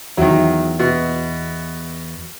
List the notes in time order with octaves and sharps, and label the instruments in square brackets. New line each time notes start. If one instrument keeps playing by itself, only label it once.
[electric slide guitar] E2 E5 [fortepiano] D#3 F#3
[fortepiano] B2